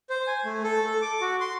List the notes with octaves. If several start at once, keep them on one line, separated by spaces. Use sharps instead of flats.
C5
G#5
A3
A4
A4
D6
F#4
C6